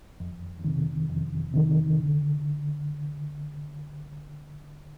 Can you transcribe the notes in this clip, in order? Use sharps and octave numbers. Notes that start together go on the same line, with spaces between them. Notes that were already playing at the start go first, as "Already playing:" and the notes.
F2
C3 D#3
F2
C3 D#3
D3